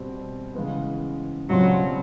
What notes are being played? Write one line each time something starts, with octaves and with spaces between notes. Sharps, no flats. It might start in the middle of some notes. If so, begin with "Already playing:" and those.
Already playing: B2 G3 C4
C#3 E3 G#3 B3
C#2 B2 F#3 G3 C4 F4